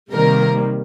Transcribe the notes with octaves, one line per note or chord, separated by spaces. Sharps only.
C3 D#3 G3 A#3 A#4